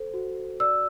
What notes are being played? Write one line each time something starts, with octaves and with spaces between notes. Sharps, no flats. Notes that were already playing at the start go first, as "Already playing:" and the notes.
Already playing: A4 C5
F#4
D5 E6